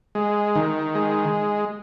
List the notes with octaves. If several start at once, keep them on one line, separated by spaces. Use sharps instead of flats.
G#3
D#3
G#3